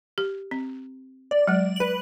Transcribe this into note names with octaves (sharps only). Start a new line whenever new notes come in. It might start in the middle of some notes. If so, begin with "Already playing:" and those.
G4
C4
D5
F#3 G#3
B4 F#7